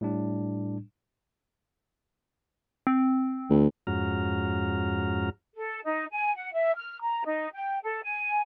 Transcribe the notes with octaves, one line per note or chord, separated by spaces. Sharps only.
A2 G3 D4
C4
D2
F2 G#2 C#4 F#4 A#5 F6
A4
D#4
G#5
F#5
E5
F6
A#5
D#4
G5
A4
G#5